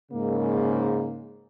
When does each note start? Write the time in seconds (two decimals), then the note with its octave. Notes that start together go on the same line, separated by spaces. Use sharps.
0.12 G#2 C#3 A#3